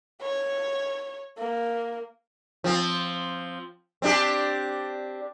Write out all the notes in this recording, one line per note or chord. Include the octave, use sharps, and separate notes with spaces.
C#5
A#3
F3 C4
C4 D4 G4